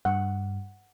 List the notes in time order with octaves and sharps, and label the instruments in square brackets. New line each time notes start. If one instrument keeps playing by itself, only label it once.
[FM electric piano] G2 [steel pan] F#5